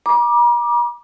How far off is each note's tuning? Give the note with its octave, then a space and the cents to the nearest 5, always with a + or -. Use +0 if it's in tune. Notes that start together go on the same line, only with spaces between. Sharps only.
A#5 +45 D6 +10